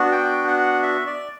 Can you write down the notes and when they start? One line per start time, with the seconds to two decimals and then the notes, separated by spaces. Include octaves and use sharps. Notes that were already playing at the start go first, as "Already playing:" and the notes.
Already playing: B3 D4 F#4
0.12 G5
0.47 F#5
0.83 E5
1.07 D5